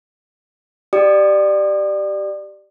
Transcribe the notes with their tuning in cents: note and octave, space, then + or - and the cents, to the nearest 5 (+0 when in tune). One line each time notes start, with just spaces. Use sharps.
G4 -15 D5 +20 D#6 -40